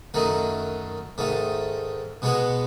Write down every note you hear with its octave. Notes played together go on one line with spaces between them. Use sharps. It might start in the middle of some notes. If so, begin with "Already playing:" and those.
F#2 D#3 F#3 A3 D#4
G#2 D#3 A3
B2 G#3 B3 F#4